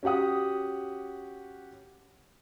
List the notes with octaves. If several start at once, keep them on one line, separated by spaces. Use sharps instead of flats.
C#4 F#4 G4 F#5 D#6